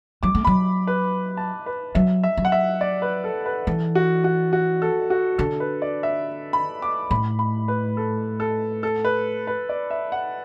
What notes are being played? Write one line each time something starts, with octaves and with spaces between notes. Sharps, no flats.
F#3 D6
A3
F#3 B5
B4
A5
B4
F#3 E5
E5
F#3
F#5
E5
D5
B4
A4
B4
E3 A4
F#4
F#4
F#4
A4
F#4
D3 A4
B4
D5
E5
B5
D6
A2 B5
B5
B4
A4
A4
A4
B4
B4
D5
E5
F#5